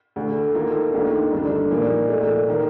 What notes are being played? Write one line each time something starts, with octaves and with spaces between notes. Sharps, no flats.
D2 D3 A3
D#3 A#3 F4 A4
D#2 D#3 A3 D4
G2 D3 A3 D4
A#2 F3 A#3 D#4
C2 A#2 A3
D#3 A#3